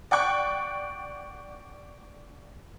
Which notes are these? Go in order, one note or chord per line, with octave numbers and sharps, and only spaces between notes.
D5 F#5 G5 C#6 F#6